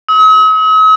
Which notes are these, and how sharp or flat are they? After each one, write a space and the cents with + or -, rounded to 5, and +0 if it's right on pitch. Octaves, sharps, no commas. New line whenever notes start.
D#6 +45